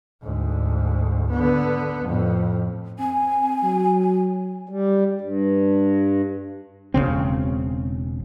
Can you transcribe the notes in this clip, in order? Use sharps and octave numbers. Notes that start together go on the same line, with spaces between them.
D2 G#2
D3 B3
F2 A2
C4 G#5
F#3
G3
G2
E1 C2 C#3 C4